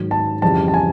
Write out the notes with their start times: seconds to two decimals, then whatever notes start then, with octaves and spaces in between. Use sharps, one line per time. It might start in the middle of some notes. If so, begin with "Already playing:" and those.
Already playing: G#2 D#3 F#3
0.11 A5
0.42 F2 C#3 E3 G3 A5
0.68 A5
0.74 G#5